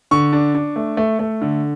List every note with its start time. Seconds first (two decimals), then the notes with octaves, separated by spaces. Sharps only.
0.11 D3 C#6
0.33 D4
0.55 D4
0.76 A3
0.97 A3
1.19 A3
1.42 D3